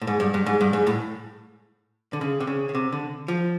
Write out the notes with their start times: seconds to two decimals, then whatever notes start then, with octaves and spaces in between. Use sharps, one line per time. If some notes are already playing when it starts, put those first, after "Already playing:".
0.02 A2
0.07 G#2
0.20 G2
0.34 G2
0.46 G#2
0.61 G2
0.73 G#2
0.87 A2
2.13 D3
2.21 C#3
2.40 C3
2.47 C#3
2.69 C#3
2.75 C3
2.93 D3
3.28 F3